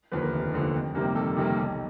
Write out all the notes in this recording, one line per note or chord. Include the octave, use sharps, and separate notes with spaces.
D#2 D3 F3 B4
A#4
F1
D#2 D3 F3
F2
C3 D#3 G3 A#3
F2 A4
C3 D#3 G3 A#3
B1